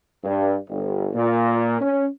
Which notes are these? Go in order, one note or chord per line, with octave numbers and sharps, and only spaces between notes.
G2
G1
A#2
C#4